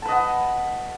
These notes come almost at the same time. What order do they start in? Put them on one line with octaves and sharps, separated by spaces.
A5 B4 D#5 F#5